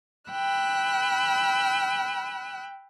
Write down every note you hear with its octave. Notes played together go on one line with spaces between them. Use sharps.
G5 B5 E6 F#6